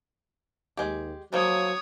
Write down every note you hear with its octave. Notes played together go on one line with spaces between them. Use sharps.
D#2 G#3 G4
F3 F#3 A#3 C#5 D#6